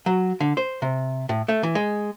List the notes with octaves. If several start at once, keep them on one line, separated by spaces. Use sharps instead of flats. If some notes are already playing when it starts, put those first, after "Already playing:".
F#3
D3
C5
C3
A2
A3
E3
G#3